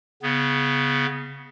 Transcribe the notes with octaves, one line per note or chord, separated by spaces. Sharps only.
C#3 B3